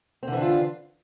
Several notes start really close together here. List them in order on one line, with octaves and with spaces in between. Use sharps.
C4 D3 E3 D4 F4